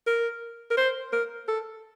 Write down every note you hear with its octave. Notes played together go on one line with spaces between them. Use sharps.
A#4
A#4
C5
A#4
A4